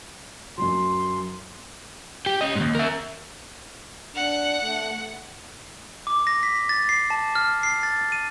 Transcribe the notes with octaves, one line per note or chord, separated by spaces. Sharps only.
F#2 F#3 C6
G4
C#4 D#5
D#2 G#2
A#4 E5
D4 F#5
A3
D6
A#6
B6
A6
C7
A5
F6
C7
A6
D#7